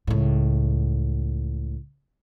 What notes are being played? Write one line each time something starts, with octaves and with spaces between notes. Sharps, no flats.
C#2 A2